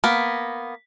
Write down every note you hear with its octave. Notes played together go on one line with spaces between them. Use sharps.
A#3 B3